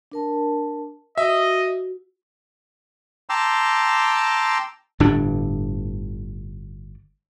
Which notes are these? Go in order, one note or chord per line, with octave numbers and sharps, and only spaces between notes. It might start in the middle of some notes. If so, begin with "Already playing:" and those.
D4 A#4 A5
F#4 D#5 E5
G5 A5 A#5 C6 D6 E6
G1 A2 D3 D4